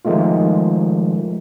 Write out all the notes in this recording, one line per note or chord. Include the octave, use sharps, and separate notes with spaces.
D#3 F3 G#3 A3 F4